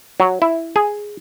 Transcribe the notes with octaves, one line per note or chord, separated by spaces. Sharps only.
F#3
E4
G#4